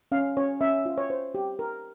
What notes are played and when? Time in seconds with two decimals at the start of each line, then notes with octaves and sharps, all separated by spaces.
0.12 C#4 F5
0.37 C#4 C#5
0.61 C#4 E5
0.86 F4
0.98 C#5
1.10 C5
1.35 G4
1.59 A#4